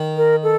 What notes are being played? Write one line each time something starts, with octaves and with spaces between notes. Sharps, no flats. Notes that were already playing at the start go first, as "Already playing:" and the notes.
Already playing: D#3
A#4
A4